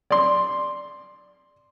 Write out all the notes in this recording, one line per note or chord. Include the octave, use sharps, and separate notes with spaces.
D5 C6